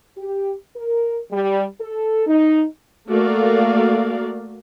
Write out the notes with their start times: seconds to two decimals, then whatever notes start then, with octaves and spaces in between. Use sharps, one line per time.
0.16 G4
0.75 A#4
1.31 G3
1.80 A4
2.27 D#4
3.08 A3 A#3 F#4 A#4 D5 F5